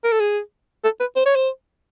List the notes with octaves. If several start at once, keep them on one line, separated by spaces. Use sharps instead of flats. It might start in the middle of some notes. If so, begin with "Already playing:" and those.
A#4
A4
G#4
A4
B4
C5
C#5
C5